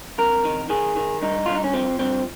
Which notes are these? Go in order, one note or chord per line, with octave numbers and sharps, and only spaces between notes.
F2 A#4
D#3
D#3 G#4
D#3
G2 D#4
G2 F4
D#4
C#4
F3 C4
G2 C4